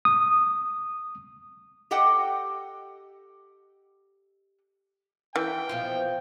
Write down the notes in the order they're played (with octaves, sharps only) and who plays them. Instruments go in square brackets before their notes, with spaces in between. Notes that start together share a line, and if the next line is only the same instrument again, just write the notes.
[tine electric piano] D#6
[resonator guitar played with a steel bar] G4 A4 D#5 F#5 G5
[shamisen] E3 [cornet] G5
[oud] B2 F3 F4